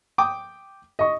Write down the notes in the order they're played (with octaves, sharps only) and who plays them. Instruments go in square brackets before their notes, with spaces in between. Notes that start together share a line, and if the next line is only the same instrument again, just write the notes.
[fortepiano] G5 D6 D#6
[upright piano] D#5 C#6